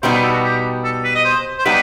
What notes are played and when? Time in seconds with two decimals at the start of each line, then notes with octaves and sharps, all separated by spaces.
0.02 B2 G3 B3 D#4 C5
0.13 B4
0.23 A4
0.33 F#4
0.44 G4
0.84 A4
1.04 B4
1.15 D#5
1.25 C5
1.59 C5
1.66 G3 B3 D#4 B4